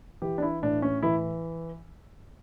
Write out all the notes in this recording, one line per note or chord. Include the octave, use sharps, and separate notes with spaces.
E3 G4
D4
E4
A2 D4
C#4
E3 E4